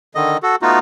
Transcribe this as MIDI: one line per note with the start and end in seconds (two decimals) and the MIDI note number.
0.15 0.37 50
0.15 0.37 51
0.15 0.37 75
0.43 0.56 66
0.43 0.56 69
0.62 0.79 57
0.62 0.79 59
0.62 0.79 63
0.62 0.79 65
0.62 0.79 66